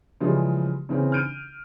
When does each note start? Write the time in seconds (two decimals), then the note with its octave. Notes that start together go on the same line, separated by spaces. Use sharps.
0.21 C#3 E3 F3 G3 G#3 C#4
0.89 C#3 E3 C4 C#4
1.12 F6 G6 D7 D#7